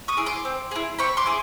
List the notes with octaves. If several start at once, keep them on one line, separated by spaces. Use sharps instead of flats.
C#6 D#6
E4 G#4
C6 D6
C4
E4 G#4
C4 B5 C#6
C6 D6
E4 G#4